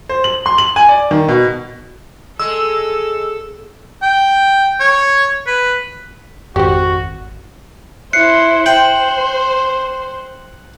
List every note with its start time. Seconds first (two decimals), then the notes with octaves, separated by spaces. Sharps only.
0.09 C5
0.24 F#7
0.46 C6
0.58 F#7
0.76 G#5
0.89 D5
1.11 D#3
1.28 B2
2.40 G#3 A4 E6
4.02 G5
4.80 C#5
5.47 B4
6.56 G#1 F2 F#4 G4 C5
8.13 E4 C5 F#6 C7 C#7
8.66 C5 G5 F#7